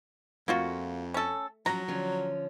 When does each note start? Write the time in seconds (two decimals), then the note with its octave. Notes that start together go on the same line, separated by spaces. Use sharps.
0.48 F2 A3 A#3 F4 F#4
1.14 C#4 A4
1.66 F3 F#3 C#4 A#5
1.88 D3 F3 C#4